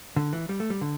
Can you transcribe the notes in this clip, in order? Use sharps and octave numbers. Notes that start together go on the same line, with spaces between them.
D3
E3
G3
A3
G3
D3